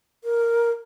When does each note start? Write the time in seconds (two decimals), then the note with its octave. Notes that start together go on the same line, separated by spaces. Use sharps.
0.24 A#4